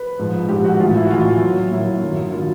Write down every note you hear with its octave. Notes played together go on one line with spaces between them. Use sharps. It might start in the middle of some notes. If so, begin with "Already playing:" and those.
Already playing: B4
G#2 F3
G#2 F3 G4
F#4
A2 E3 F4
E4
F#4
A2 E3 F4
A#2 F#3
A#2 F#3 E4
G2 D#3 F#3
D#3 F#3 F4